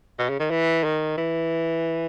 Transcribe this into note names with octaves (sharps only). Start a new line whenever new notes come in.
B2
C#3
D#3
E3
D#3
E3